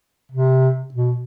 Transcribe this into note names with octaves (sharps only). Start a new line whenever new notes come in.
C3
B2